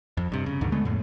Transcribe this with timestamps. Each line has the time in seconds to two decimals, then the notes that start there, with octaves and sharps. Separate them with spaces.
0.17 F2
0.32 G2 C3
0.46 C#3
0.61 D2 G2 D3 D#3
0.72 D3 G#3 A3 B3
0.85 F2 A2